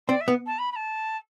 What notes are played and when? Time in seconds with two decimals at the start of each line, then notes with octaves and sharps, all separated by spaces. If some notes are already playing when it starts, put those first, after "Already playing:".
0.08 C4 D5
0.21 E5
0.28 B3
0.46 A5
0.58 B5
0.72 B5
0.76 A5